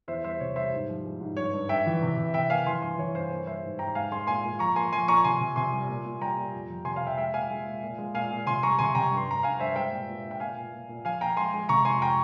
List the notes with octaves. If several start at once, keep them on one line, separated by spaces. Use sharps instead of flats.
E2 C5 E5
G3 C5 E5
C3 C#5
G3 C5 E5
G#2
F3
G#3
G#2
G2 C#5
G2
G2 E5 G5
E3
C3
C3
C3 E5 G5
A#3 F5 G#5
E3 G#5 C6
G2 G#5 C6
E3 C#5
G2 C5
A#3 C#5
G3 C5 E5
G#2
G#2 G5 A#5
G#3 F5 G#5
G#3 G#5 C6
A#2 G#5 C6
A#2
F3 A#5 C#6
A#3 G#5 C6
F3 G#5 C6
A#2 A#5 C#6
C3 G#5 C6
C3
C3 G#5 C6
G3
A#2
A#2
G3 G5 A#5
A#2
F2
F3
C3 G#5 C6
F5 G#5
C3 E5 G5
G#3 E5 G5
A#2 F5 G#5
G#3
A#2
A#2
G#3
A#2 F5 G#5
A#2
C3 G#5 C6
G3 A#5 C#6
C3 G#5 C6
C3 G5 A#5
G2
C6
G2 A#5
G2 F5 G#5
G2 C5 E5
G#3 E5 G5
A#2
A#2
A#2
G5
A#2 F5 G#5
A#2
A#2
A#2
F3 F5 G#5
A#2 G5 A#5
G#3 G#5 C6
G#3
C3 A#5 C#6
F2 G#5 C6
G5 A#5